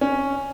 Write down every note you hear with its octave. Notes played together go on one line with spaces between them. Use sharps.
C#4